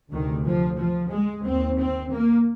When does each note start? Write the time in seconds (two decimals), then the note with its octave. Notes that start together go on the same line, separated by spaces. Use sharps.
0.12 D2 C3 D#3
0.45 F3
0.78 F3
1.11 G#3
1.44 D#2 C4
1.78 C4
2.11 A#3